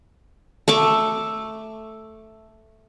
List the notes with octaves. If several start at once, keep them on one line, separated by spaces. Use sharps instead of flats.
A3 C#6 D6